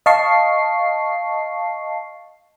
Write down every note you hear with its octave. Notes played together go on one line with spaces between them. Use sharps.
D#5 F5 A5 C#6 C7